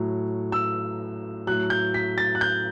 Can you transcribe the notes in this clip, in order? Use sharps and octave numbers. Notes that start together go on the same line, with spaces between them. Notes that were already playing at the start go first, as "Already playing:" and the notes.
Already playing: A2 F#3
E6
A2 F#3 F#6
G6
B6
A6
F#6
G6